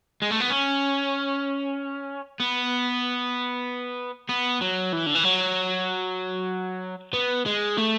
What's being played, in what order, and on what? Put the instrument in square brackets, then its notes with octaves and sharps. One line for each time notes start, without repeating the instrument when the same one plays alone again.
[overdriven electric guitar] G#3
A3
B3
C#4
B3
B3
F#3
E3
D3
E3
F#3
B3
G#3
A3